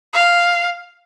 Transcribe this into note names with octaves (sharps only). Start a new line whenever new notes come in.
F5